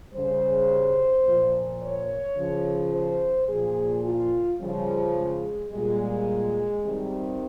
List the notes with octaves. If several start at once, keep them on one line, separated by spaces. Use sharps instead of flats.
C#3 G3 C5
A#2 F3
C#5
C#3 F3
C5
A#2 F3 G#4
F4
C#3 F3 G3
G#3
A#2 G3 G#3
C3 D#3 G3